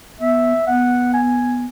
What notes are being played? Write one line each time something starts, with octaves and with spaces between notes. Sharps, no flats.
B3 E5
B3 F#5
G#5